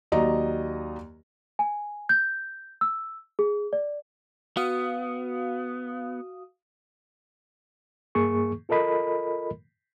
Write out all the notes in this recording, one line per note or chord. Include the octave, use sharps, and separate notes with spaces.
D#2 F#3 D5 D#5 A#5
G#5
G6
E6
G#4
D5
B3 F#4 F5 D#6
G2 A#3 G#4 C#6
F4 A4 A#4 D#5 B5